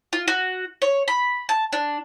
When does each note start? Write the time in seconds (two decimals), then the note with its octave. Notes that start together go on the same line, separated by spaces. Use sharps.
0.13 F4
0.28 F#4
0.82 C#5
1.08 B5
1.49 A5
1.73 D4